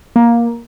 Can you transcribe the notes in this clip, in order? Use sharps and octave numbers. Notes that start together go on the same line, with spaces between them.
A#3